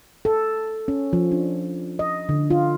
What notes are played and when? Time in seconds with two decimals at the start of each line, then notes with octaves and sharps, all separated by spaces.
0.25 A4
0.88 C#4
1.13 F3
1.32 D4
1.99 D#5
2.29 D3
2.50 F4